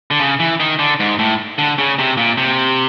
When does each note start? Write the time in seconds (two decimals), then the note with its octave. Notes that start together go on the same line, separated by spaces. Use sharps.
0.11 D3
0.20 C#3
0.40 E3
0.60 D#3
0.79 D3
1.00 G#2
1.19 A2
1.58 D3
1.78 C#3
1.99 C3
2.17 A#2
2.38 C3